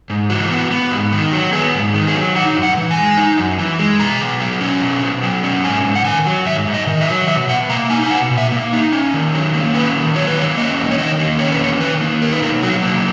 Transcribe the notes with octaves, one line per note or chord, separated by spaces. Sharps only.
G#2
E3 F#4
B3
B3
G#2
D#3
F#3
B3 G#4
G#2
D#3
G#4
F#3
D#4 F#5
F#2
F#5
E3
G#5
G#3
D#4
F#2
E3
G#3
B2 A#5
B2
F#3
C#4
B2
B2
F#3
C#4
G#2 G#5
G#2
F#5
D#3 G#5
F#3
G#2 E5
G#2
D#5
D#3
E5
F#3
B2 E5
B2 F#5
A#3 A#5
D#4 G#5
G#5
B2 F#5
B2
E5
A#3
D#4
C#4
D#3
F#3
A#3
C#4 B4
D#3
F#3 C#5
B4
A#3 C#5
C#4 D#5
E2
C#5
D#3 D#5
A#3
C#4 C#5
B4
E2 C#5
D#3 B4
A#3
D#4 A#4
B4
B2 A#4
F#3 F#4
A#3